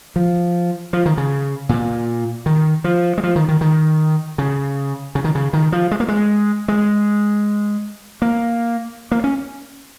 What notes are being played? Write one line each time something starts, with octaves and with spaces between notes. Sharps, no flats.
F3
F3
D#3
C#3
A#2
D#3
F3
G#3
F3
D#3
D#3
D#3
C#3
C#3
D#3
C#3
D#3
F3
G#3
A#3
G#3
G#3
A#3
A#3
C#4